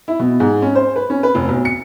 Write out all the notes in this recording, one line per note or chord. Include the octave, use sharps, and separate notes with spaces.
E4
B2
G#2
C#4
C5
B4
C#4
B4
F1
B1
C#7